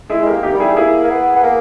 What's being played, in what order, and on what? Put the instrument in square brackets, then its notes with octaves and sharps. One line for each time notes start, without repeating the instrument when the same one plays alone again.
[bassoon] G#3 [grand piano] E4 G#4
[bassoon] G#3 [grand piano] G4 A#4
[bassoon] A#3
[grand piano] D#4 G4
[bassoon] G3
[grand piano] E4 G#4
[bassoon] A#3 [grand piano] E4 G#4
[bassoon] A#3
B3
B3
A#3